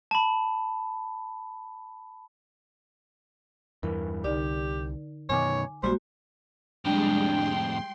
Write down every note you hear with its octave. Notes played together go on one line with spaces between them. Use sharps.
A5 B5
E2 G2 E3 A#4
C2 D3 D#4 G4 D5
F#2 B2 D#3 C#5 G#5 D6
A#1 G3 G#3 A#3 F#4 C5
F2 A2 G3 G#3 D4 G#4 G5
C6